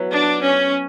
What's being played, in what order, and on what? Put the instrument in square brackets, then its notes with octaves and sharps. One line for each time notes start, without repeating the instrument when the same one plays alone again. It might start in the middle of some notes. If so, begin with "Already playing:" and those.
Already playing: [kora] F#3 B3 E4
[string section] D4
C#4